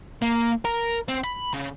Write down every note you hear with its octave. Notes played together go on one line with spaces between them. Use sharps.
A#3
A#4
C4
B5
C#3